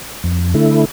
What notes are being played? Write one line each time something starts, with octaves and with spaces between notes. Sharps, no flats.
F2
D3 A3 E4